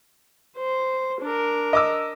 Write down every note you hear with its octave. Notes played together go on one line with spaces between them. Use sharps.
C5
D4 A#4
D#5 D6 E6